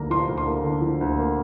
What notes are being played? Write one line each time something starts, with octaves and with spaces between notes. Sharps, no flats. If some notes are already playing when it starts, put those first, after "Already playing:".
Already playing: D2 D3 A#3 A#5
F3 C6
D2
C6
A#3
D3
F3
D2
A#3